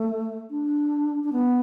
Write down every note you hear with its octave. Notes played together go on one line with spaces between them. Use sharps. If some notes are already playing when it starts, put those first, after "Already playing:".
Already playing: A3
D4
D4
B3